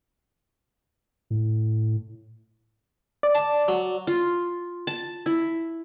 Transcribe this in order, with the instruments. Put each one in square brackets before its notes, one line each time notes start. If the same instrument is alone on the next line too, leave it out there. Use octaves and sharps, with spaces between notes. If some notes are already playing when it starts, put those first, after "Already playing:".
[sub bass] A2
[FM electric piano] D5
[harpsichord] A5
F#3
[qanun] F4
A5
E4